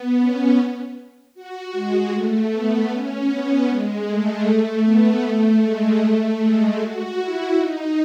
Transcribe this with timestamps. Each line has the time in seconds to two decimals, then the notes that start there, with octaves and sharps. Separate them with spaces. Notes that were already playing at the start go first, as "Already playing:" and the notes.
Already playing: B3
0.18 C#4
1.34 F#4
1.73 G#3
2.11 A3
2.51 B3
2.90 C#4
3.28 B3
3.68 G#3
4.06 A3
4.84 B3
5.22 A3
5.62 G#3
6.00 A3
6.38 G#3
6.78 F#4
7.16 E4
7.54 D#4